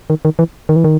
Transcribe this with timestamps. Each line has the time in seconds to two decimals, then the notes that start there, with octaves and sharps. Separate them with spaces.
0.10 D#3
0.25 D#3
0.39 E3
0.69 D#3
0.76 E3
0.84 D#3